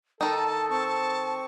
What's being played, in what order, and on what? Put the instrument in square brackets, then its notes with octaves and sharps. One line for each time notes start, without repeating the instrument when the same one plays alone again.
[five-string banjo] D#3 D#4 [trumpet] A4 [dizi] A5
[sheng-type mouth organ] C4 C#6 [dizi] A5